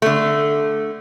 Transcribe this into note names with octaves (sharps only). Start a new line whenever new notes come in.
D3 A3